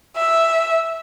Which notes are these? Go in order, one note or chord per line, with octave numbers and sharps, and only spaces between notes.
E5